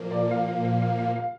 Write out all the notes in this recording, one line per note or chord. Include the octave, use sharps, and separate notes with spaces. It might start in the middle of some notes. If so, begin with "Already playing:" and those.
Already playing: A#2 F3 A#3
D5
F5
F5
F5
F5
F5
F5